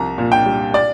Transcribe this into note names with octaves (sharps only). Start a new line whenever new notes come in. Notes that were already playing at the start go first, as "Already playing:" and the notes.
Already playing: C2 F3 A#5
A#2
G5
G3
D5